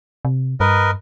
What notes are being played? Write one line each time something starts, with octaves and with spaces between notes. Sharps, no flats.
C3
G2 A#4 B4 D#5